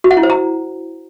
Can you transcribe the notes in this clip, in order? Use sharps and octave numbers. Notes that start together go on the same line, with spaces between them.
F#4
F#5
E4
C5
A#5